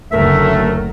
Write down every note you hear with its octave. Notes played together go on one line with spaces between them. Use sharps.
F#1 D2 F#3 A3 A#4 E5